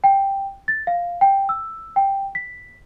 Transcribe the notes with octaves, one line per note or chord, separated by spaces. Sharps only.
G5
A6
F5
G5
E6
G5
B6